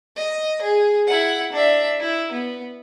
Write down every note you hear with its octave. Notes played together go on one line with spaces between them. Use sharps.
D#5
G#4
E4 F#5
D4 E5
E4
B3